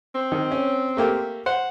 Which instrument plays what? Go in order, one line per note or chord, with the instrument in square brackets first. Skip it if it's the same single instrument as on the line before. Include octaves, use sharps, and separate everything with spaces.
[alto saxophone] C4
[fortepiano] D#3
C#4
A3 A#3 G4
[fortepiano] C5 [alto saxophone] F#5